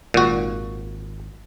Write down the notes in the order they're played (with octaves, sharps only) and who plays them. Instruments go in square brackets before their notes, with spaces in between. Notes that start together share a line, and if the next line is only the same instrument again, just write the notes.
[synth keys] G#1 [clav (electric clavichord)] A#2 F#4